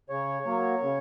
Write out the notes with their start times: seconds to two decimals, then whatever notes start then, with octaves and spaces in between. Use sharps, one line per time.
0.10 C#3 C#5
0.46 F#3 A#3
0.82 C#3